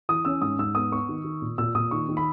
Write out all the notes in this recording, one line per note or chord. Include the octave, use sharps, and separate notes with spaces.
E3 D#6
C#4 E6
G#2 D#6
G#2 E6
B3 D#6
B3 C#6
D#3
D#3
A#2
A#2 E6
A#2 D#6
D#3 C#6
D#3
B5